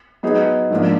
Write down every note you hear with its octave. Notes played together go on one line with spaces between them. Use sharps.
F#3 B3 D#4 G#4
G#2 F3 A#3 D4